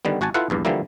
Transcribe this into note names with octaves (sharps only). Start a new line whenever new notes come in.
D3 D#3 G3 B3
G#1 F#4 F#5 G#5 A5
E4 F4 A4 B4 F5 F#5
A#1 E2 G2
D3 E3 F3 G3 A#3 E4